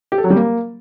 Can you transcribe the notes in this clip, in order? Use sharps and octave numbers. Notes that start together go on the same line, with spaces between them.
G4
A4
F#3
G3
A#3